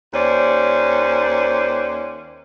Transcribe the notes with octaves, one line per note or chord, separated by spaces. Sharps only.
D#2 C#4 C5 D5